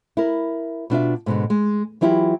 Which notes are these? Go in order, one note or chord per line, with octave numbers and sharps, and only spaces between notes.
E4 A#4
B2 D4 F4 E5
G#2 B2 D3
G#3
E3 F#3 E4 F4 G4